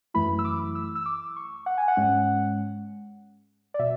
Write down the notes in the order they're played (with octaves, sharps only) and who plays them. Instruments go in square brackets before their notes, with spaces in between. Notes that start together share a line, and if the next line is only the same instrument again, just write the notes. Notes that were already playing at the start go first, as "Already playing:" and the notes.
[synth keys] F#2 E3 A3 E4 B5
E6
D6
E6
E6
D6
C#6
F#5
G#5
F#5
G#2 G#3 C#4
D5
B2 E5